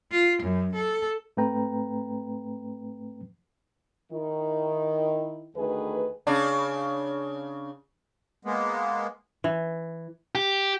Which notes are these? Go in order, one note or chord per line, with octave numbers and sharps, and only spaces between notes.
F4
F#2
A4
G#2 A3 C4 B4 G5 A#5
D#3 E4
D2 D#3 A3 G#4 B4
C#3 D4
G#3 A#3 B3
E3
G4